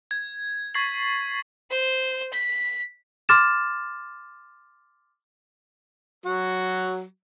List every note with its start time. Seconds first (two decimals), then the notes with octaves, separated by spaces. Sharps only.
0.11 G#6
0.74 C#6 G#6 A6 B6 C7 F#7
1.71 C5
2.33 B6
3.29 C6 D6 F6 A6 E7
6.26 F#3 F#4